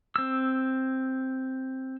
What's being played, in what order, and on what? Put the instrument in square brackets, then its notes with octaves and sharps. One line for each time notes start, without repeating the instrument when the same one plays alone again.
[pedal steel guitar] C4 E6